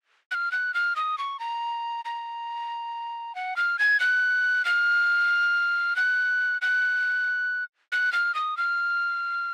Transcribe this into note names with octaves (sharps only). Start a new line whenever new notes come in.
F#6
F6
F#6
F6
D#6
C#6
A#5
A#5
F#5
F6
G#6
F#6
F6
F#6
F#6
F#6
F6
D#6
F6